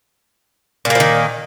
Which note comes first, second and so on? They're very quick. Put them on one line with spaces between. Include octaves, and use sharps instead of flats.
A#2 A#3 F3 D#3